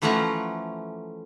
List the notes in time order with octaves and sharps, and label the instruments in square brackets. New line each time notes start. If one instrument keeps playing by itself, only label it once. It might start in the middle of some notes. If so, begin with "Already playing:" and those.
[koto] E3 F3 A3 C#4 F#5 A#5